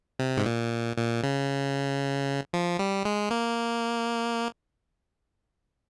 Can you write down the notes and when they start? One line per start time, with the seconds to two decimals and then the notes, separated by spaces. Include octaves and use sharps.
0.19 C3
0.37 G#2
0.45 A#2
0.98 A#2
1.23 C#3
2.53 F3
2.79 G3
3.05 G#3
3.31 A#3